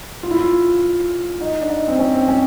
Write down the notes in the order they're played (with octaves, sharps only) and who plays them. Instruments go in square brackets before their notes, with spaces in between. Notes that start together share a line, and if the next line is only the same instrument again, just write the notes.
[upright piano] F4
E4
F4
D#4
D4
D#4
C4
C#4
C4
C#4